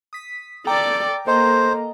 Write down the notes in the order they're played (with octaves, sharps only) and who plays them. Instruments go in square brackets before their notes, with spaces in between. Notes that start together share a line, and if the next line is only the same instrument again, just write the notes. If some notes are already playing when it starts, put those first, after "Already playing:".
[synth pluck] D#6 B6
[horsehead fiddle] A4 D5 [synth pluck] G5 A#5 D6
[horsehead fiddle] A#3 [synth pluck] A4 D#5 A#5 [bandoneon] C5